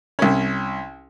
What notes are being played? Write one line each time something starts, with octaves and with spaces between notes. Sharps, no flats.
C2 C#4